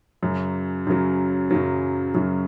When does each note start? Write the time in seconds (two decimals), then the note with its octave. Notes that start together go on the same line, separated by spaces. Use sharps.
0.22 F#2 C#3 F#3
0.87 F#2 C#3 F#3
1.51 F#2 C#3 F#3
2.14 F#2 C#3 F#3